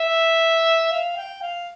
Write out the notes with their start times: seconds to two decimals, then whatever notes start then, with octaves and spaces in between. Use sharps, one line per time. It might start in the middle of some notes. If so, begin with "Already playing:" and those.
Already playing: E5
0.92 F5
1.17 G5
1.42 F5